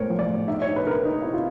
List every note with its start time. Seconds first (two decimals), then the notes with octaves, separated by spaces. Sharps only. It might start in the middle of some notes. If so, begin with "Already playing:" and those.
Already playing: A2 G#3 A#4 C5 C#5
0.10 F3
0.19 D5
0.28 A2
0.48 D#4 E5
0.62 C#5
0.67 D#4
0.76 B4
0.86 D#4 A#4
0.91 B4
1.05 D#4
1.22 C4 E4
1.34 F4